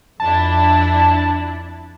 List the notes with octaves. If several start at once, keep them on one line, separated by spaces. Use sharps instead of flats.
F2 D4 E4 A5